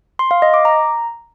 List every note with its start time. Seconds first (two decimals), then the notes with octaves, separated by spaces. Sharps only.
0.19 C6
0.31 F5
0.42 D#5
0.54 D6
0.65 A#5